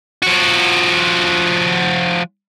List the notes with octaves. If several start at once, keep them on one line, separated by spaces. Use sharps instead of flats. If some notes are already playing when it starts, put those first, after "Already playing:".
F3 F#4